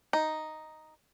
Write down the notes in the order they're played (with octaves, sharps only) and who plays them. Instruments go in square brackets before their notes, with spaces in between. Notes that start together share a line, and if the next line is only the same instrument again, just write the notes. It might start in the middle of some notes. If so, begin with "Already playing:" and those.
[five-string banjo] D#4